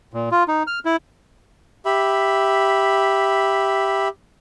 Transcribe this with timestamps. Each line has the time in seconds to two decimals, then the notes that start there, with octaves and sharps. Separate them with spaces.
0.14 A#2
0.31 F4
0.48 D#4
0.67 F6
0.85 E4
1.85 G4 E5 B5